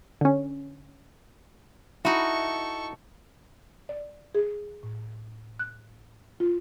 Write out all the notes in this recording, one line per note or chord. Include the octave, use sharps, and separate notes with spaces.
D3 C#4
D#4 E4 F#4 A4 C#6
D5
G#4
A2
F#6
F4